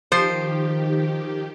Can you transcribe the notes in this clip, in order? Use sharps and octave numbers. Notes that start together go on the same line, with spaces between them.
D#3 F3 G4 C5